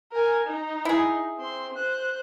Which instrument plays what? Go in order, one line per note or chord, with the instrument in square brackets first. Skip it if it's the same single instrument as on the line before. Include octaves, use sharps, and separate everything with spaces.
[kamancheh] A#4 G#5
D#4
[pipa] E4 G#4
[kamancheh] C4 C6
C5 F#6